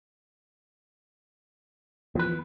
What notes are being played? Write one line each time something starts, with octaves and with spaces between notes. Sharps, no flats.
E2 F3 B4